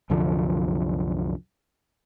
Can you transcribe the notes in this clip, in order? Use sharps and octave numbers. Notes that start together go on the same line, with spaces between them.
C2 F#2 D3 F3